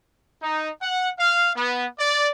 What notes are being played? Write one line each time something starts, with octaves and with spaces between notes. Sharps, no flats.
D#4
F#5
F5
B3
D5